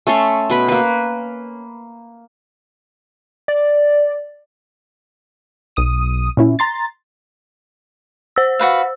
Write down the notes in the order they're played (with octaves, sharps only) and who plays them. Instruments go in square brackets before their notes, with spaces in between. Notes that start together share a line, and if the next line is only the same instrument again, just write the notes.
[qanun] A3 C#4 A4 C6
B2 B4 B5
A#3 B4
[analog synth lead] D5
[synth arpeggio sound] B1 D#6 D#7
A#2 C#4 E4
A#5 C6 A6
[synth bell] C5 E6
[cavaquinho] F#4 B4 F5